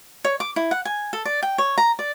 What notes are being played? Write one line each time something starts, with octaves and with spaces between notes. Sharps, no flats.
C#5
D6
E4
F#5
G#5
A4
D5
G5
C#5
A#5
D5